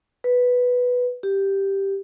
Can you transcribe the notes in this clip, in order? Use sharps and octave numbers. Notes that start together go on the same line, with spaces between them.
B4
G4